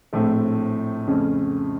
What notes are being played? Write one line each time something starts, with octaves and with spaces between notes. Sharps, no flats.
A#1 A2 A3 C4
F2 C#3 A3 C#4